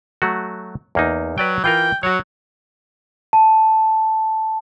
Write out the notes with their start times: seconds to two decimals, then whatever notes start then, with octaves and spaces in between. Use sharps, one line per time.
0.22 F#3 A3 F#4
0.95 E2 A#3 D#4
1.38 F#3 B4 D5 G5
1.64 E3 F4 A#4 G5
2.03 F#3 F#4 C#5
3.33 A5